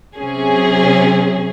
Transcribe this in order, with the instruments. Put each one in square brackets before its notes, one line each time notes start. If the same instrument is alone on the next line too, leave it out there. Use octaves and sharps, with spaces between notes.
[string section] C3 F#3 C#4 G#4